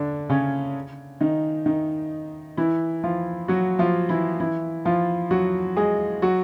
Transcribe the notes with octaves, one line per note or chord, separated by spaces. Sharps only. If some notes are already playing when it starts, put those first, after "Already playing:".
Already playing: D3 D4
C#3 C#4
D#3 D#4
D#3 D#4
E3 E4
F3 F4
F#3 F#4
F3 F4
E3 E4
E3 E4
F3 F4
F#3 F#4
G#3 G#4
F#3 F#4